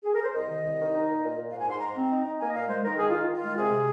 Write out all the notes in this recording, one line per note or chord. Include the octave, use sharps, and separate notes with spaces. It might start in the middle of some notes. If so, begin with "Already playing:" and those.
G#4
A#4
C5
C2 D#5
D#3
C2
D#3
D#4
A#2
A#2
A#2
G#2 F5
G#5
G#2 C6
G#2 A#5
C4
D#4
D#4
A#3 G#5
D#5
A#2 F5
G#3 C5
D#3 A#4
D#3 G#4
D#3 F4
D#3
F4
G#3
C3 G#4
C3